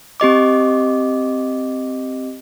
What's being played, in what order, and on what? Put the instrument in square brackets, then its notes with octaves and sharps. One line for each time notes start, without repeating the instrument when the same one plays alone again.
[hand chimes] C4 G4 D#5 D6